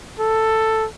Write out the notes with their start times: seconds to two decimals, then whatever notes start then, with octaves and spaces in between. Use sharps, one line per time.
0.19 A4